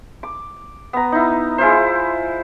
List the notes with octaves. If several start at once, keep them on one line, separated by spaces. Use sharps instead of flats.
D6
B3 A#5
D#4 E4
G#3 E4 F4 C5